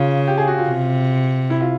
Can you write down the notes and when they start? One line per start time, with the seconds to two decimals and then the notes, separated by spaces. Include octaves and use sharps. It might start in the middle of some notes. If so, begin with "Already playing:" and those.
Already playing: C#3 F4
0.27 G4
0.38 G#4
0.47 F#4
0.58 F4
0.69 C3
1.50 E4
1.61 F4